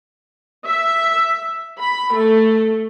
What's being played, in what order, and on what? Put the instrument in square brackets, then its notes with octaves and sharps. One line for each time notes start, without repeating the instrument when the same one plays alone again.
[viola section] E5
B5
A3